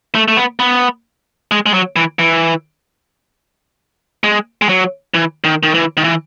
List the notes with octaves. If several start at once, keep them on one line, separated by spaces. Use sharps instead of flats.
A3
A3
B3
B3
G#3
G#3
F#3
E3
E3
G#3
G#3
F#3
E3
D#3
D#3
E3
D#3
E3